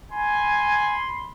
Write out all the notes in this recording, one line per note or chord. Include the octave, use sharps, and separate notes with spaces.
G#5 B5 C6